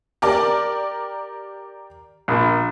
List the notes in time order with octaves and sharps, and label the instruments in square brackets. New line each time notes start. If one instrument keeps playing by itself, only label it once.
[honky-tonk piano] G4 A#4 D5
[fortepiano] A#1